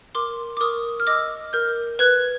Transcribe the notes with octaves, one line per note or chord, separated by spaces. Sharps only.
A#4 C6 D6
D6
A#4 C#6 D#6
F6
D#5 D6 E6
A#4 F6 G6
B4 F#6 G#6